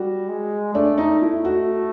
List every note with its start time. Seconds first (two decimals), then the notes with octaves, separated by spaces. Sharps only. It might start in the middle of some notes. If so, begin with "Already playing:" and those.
Already playing: G3 F#4
0.28 G#3
0.74 A3 D4
0.98 D#4
1.21 A3 E4
1.45 F#4